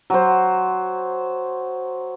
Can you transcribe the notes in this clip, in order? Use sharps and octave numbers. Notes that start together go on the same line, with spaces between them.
F#3 C5